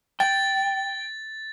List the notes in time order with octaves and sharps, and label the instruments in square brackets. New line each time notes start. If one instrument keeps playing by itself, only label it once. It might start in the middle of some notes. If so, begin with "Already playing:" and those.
[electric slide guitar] G5 [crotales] A6